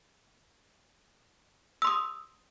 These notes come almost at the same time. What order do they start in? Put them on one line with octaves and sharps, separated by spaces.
E6 C6 D#6